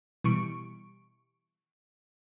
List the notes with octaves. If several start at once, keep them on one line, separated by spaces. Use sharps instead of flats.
B2 E3 G3 C#6 D7